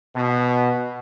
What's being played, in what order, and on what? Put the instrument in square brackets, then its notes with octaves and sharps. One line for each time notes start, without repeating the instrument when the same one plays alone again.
[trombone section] B2